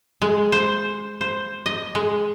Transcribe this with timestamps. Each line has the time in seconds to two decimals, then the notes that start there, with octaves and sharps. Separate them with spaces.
0.22 G#3
0.52 C5
1.21 C5
1.66 D#5
1.95 G#3